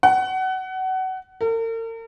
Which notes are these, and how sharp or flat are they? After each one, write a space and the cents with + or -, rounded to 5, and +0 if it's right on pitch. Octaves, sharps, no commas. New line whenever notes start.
F#5 +25
A#4 -45